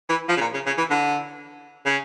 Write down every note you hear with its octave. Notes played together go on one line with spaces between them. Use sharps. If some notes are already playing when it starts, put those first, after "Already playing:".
E3
F3
C#3
A#2
C#3
C#3
E3
D3
C#3